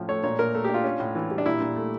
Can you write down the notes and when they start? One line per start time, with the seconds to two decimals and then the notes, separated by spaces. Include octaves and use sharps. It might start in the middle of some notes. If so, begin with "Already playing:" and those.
Already playing: A2 F3 C#4
0.08 A3 C#5
0.24 A#2 C#5
0.39 A#2 A#4
0.55 A3 A4
0.65 G4
0.69 D4
0.74 F4
0.84 C#4
1.00 A2
1.15 E3
1.31 G3
1.38 D4
1.46 A#2 E4
1.61 A#2
1.76 A3